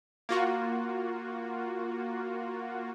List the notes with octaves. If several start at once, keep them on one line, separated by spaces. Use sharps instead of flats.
A#3 F4 F#4